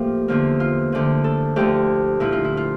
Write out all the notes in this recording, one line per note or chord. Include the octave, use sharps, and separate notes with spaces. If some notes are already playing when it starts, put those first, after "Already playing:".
Already playing: A2 F3 A#3 G4
E2 D3 F3 A#3
F4
D2 D3 F3
A4
D2 D3 F3 A3 G4
A#2 F3 A#3 E4
F4
E4
F4